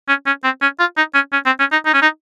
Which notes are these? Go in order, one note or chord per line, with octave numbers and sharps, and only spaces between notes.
C#4
C#4
C4
C#4
F4
D#4
C#4
C#4
C4
C#4
D#4
D#4
C#4
D#4